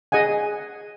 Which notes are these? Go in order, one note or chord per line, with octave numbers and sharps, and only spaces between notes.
G#4 D#5 F#5 G#5